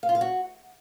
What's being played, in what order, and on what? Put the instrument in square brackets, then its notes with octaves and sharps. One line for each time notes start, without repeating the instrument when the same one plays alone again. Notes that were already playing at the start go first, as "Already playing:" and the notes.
[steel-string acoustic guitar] F5
F4
F5
F#4